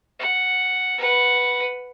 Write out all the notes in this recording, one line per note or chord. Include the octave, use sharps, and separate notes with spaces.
F#5
B4 F#5